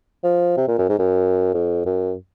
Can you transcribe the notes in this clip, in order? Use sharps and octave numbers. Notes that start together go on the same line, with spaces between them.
F3
C3
A#2
F#2
G#2
F#2
F2
F#2